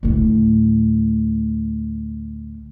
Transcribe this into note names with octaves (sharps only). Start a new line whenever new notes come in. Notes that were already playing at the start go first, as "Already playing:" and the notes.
D2 A2